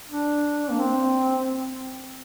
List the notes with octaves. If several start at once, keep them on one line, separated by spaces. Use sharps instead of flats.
D4
A#3
C4